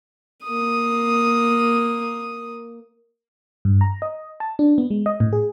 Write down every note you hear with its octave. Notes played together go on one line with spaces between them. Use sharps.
A#3 D#6
G2
A#5
D#5
A5
D4
B3
G#3
D#5
A2
G#4